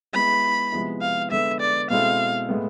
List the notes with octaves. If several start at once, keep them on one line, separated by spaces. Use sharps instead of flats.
G#3 B3 E4 B5
C3 F3 G#3 B3 E4
F5
D3 G#3 B3 E5
D5
B2 G#3 C4 E4 A4 F5
A2 G#3 B3